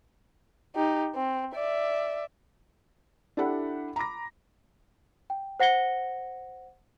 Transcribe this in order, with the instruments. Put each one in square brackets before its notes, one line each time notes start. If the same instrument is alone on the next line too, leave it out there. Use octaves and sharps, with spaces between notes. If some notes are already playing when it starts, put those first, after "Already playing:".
[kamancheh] D#4 G4
C4
D5 E5
[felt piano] D4 E4 G4 A4 F#5 B5
A#5 B5 D6 A#6
[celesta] G5
C5 F#5 A#6 C#7 G7